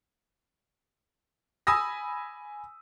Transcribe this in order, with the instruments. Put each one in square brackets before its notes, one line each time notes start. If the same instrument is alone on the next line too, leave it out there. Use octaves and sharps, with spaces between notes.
[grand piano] G#5 B5 D#6 E6 A#6